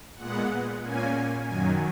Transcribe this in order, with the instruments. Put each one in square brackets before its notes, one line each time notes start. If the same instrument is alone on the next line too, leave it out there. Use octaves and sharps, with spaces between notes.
[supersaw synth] A#2 G#3 B3 F#5
A#2 A#3 C#4 G#5
F#2 D#3 F#3 G#5